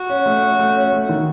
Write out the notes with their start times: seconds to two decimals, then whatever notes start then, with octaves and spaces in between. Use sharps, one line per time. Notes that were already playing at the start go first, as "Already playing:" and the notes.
Already playing: F#4
0.09 C#4
0.26 A3
0.43 C#4
0.59 A3
0.76 C#4
0.92 A3
1.09 D#3